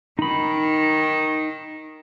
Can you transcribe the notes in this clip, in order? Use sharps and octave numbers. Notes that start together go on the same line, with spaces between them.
D#3 D#4 B5